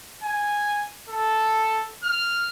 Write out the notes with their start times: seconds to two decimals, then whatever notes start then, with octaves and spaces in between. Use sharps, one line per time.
0.23 G#5
1.09 A4
2.03 F6